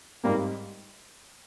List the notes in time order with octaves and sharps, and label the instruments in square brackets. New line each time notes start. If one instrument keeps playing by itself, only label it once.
[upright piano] G#2 G3 C4 [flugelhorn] A#3